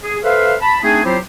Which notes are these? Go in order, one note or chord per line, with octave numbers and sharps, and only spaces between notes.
G#4
A4 B4 C5 E5 F5
A5 B5
A3 C4 D4 D#4 G#4
F#3 C4 E4 F4 G4 C5